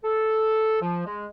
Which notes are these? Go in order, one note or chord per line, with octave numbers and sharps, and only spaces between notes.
A4
F3
G#3